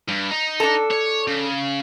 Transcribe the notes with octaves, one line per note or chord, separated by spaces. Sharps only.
G2
D#4
D4 A4
C#5
C#3